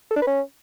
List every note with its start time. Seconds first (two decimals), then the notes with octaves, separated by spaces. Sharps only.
0.11 A4
0.16 D4
0.21 B4
0.27 C#4